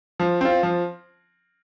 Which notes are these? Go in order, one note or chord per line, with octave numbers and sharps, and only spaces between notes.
F3
C4 F4
F3